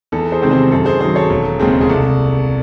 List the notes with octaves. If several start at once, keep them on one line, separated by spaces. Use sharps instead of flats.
E2 A4
G#4 C5
C3 D#3 G#3 C4
G#4 C5
F#2 A4
G#4 C5
D#3 F#3 G#4 C5
A4 C#5
E1
D#2 C#3 G#3 C4
G#4
C2 A4